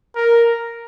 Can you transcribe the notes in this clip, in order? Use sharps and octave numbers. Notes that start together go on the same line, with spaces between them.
A#4